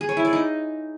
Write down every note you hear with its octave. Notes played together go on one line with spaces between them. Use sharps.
G#4
C#5
E4
D5
D#4